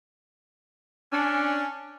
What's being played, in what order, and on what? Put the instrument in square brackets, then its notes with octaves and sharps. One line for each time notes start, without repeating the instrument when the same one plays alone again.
[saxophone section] C#4 D4